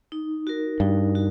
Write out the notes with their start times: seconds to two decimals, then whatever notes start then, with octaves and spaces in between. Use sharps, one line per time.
0.12 D#4
0.47 F#4 A#4
0.80 G2 D#4
1.15 F#4